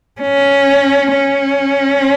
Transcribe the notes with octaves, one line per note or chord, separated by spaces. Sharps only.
C#4
C#4